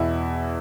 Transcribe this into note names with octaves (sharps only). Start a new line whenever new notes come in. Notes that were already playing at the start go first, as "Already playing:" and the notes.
Already playing: E2 B2 E4